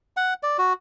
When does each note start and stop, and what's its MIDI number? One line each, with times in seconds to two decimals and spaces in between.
0.17 0.34 78
0.43 0.57 74
0.58 0.73 66